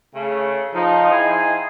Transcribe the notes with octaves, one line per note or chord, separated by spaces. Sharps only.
C#3 A3
F3 D#4
D#4 E4 G#4 C5 G5 G#5